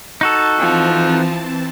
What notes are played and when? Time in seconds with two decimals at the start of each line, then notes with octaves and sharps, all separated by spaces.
0.21 D#4 F#4 A4 A5
0.59 E3 F3 C4 A5